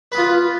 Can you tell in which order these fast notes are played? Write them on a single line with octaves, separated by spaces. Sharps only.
B4 B3 F4